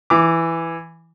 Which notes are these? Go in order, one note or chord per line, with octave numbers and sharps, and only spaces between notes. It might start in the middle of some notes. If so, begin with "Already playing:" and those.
E3 D6